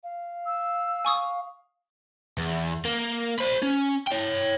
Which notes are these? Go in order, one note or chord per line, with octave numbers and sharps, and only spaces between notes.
F5
E6
G#5 C#6 D#6
E2
A#3
C5 B5
C#4
C#5 G5